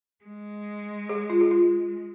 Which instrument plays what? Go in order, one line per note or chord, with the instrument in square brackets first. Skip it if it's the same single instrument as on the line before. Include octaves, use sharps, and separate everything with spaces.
[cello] G#3
[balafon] G#4
F4
G#4
F4